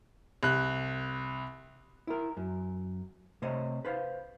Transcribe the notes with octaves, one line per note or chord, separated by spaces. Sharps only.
C2 F#6
E4 A#4
F#2
C3 A3 C5 C#5 D#5
B4 C5 F5